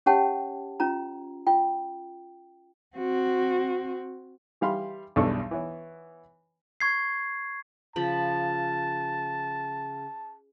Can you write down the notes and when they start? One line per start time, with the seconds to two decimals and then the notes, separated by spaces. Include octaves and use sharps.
0.06 C#4 G4 C#5 F#5 G5 A5
0.80 C#4 F4 A#5
1.47 F4 G5
2.96 C4 F#4
4.61 E3 G3 F5 B5 C6
5.16 B1 E2 G2 D4 A4 C#6
5.51 E3 B3 C#5
6.80 C#6 G#6 C7
7.96 C#3 F3 A5 B5